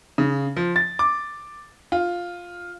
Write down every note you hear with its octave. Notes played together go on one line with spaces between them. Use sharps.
C#3
F3
A6
D6
F4